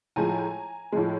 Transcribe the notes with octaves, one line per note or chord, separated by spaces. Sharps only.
A2 F3 G#3 G#5 A#5
A2 F3 G#3